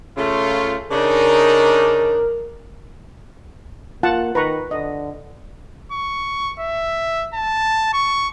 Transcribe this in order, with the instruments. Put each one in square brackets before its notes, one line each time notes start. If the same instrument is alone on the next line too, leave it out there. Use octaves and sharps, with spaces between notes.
[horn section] C#3 A3 F4
[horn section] C#3 D4 D#4 [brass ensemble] A#4
[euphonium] A#3 [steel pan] F4 F#5 A5
[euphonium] D#3 [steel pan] B4 A#5 C#6
[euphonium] D3 [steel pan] D#5
[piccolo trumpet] C#6
E5
A5
C#6